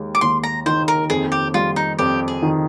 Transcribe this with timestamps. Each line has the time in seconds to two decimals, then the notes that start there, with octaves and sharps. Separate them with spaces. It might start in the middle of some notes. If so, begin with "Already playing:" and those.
Already playing: D#2 G#3
0.15 D6
0.21 D#2 C6
0.43 A#5
0.66 D#3 C5
0.88 A#4
1.10 F2 G#4
1.32 G4
1.54 G3 F4
1.76 D#4
1.99 F2 G4
2.28 G#4
2.42 D#3